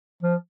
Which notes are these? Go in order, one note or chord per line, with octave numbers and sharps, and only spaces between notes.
F3